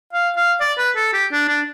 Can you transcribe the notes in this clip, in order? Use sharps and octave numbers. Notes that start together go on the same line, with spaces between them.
F5
F5
D5
B4
A4
G4
D4
D4